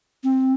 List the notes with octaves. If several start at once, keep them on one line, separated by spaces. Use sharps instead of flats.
C4